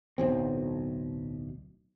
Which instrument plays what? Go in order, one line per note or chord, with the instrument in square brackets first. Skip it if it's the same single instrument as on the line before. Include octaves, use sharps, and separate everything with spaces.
[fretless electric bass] D1 B1 C4